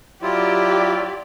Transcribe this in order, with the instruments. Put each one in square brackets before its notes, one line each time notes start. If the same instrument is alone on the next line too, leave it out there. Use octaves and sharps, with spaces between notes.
[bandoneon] F#3 E4 F4 [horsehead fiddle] G4 D5